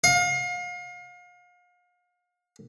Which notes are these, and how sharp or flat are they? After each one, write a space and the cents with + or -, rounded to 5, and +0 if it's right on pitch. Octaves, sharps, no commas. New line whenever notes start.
F5 +35